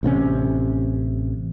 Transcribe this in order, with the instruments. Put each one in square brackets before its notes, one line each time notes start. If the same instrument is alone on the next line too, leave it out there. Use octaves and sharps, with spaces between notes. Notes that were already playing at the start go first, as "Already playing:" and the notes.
[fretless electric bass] A1 C3 C4 C#4